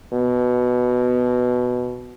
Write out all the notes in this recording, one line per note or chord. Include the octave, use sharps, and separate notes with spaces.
B2